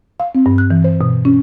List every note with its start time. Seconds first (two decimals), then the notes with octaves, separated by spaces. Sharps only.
0.20 F5
0.35 C4
0.46 G2
0.58 F#6
0.71 E3
0.84 C5
1.01 B2
1.25 C#4